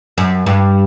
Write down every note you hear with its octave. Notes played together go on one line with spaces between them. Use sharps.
F#2
G2